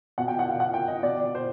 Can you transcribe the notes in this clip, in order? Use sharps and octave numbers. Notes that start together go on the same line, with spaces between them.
B2 F#5
G5
F#5
F5
F#5
G5
D#5
B2 D5
C5